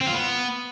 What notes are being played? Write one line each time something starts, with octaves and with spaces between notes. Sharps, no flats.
C4
F4
B3